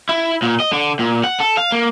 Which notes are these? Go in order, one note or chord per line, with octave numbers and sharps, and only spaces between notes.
E4
A#2
D#5
D3
A#2
F#5
A4
F5
A#3